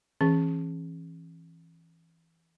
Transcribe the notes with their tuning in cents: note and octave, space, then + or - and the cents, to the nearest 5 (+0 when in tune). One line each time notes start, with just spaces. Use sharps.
E3 +0 C#4 -25 G#4 +0